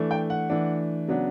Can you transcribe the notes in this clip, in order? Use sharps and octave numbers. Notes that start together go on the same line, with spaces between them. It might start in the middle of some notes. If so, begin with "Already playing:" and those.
Already playing: E3 A3 D4
G5
F#5
E3 A3 D4
C#3 F#3 B3 D4